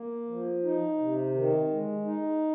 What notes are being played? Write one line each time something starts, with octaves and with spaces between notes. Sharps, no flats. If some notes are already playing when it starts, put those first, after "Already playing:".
Already playing: A#3
F3
D#4
C3
D#3
G#3
D#4